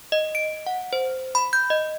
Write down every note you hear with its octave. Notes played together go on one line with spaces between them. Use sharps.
D#5
D7
F#5
C5
B5
G6
D#5